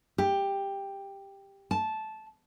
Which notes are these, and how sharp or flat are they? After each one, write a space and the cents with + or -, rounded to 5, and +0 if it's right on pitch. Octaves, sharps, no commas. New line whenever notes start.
G4 +10
A5 -10